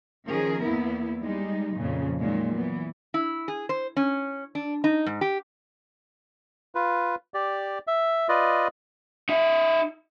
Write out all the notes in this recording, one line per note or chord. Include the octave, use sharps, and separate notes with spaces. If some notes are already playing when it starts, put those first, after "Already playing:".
D#3 F3 C#4 G#4 A#4
E2 A#3 B3 E4
G3 G#3 D#4
F2 A#2 C#3
A#2 D#3 F#3 G#3
E3 B3
E4
G#4
C5
C#4
D4
D#4
G#2
G4
F4 B4
G4 D5
E5
F4 B4 D5 D#5
D#4 E5